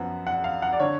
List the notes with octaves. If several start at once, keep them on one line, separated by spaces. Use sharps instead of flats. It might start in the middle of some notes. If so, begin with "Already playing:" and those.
Already playing: F#2 F3 B3 F#5
F#5
F5
F#5
D5
D3 C#5